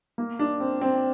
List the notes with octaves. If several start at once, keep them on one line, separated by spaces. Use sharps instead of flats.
A#3
D4
C4
C4